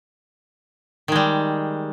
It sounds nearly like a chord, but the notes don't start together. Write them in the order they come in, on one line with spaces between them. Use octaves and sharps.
D#3 G#3 G3